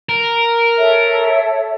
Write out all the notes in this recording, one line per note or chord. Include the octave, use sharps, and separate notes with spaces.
A#4
A4 C#5 E5